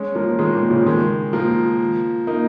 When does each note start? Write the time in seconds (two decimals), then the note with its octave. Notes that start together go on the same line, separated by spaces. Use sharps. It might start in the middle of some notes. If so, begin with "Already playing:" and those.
Already playing: G#3 C#4
0.15 F3 A#3
0.39 D#3 G#3
0.55 A#2 D#3
0.70 C#3 F3
0.86 D#3 G#3
1.33 F3 A#3
2.27 A#3 D#4